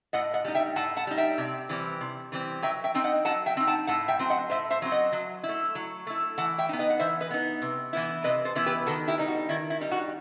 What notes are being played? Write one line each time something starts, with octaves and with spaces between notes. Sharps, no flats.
A2 D#5 F#5
D#5 F#5
G3 D#4
E5 G5
A2 F#5 A5
F#5 A5
G3 D#4
E5 G5
C3
E3 G3 C4
C3
E3 G3 C4
F#3 E5 G5
E5 G5
C4 D#4 G5
D#5 F#5
F#3 F#5 A5
E5 G5
C4 D#4
F#5 A5
A2 F#5 A5
E5 G5
F#3 C4
D#5 F#5
A2 C5 E5
C5 E5
F#3 C4
D#5 F#5
F#3
E4
A3
F#3
A3 E4
E3 F#5 A5
E5 G5
B3 D#4
B4 D#5
F#5
E3 C5 E5
B4 D#5
B3 D#4
C3
E3 B3 E4
C3 B4 D#5
A4 C5
E3 B3 E4
G4 B4
D#3 F#4 A4
E4 G4
G3 D#4
F#4
D#3 E4
E4
G3 D#4
F#4